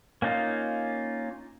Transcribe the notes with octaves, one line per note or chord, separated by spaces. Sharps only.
A#3 C#4 D#4 F4